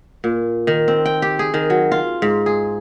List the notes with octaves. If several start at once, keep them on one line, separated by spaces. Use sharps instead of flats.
A#2
D#3
C4
G5
G4
G#4
D#3
F#3
F4
G#2
G#4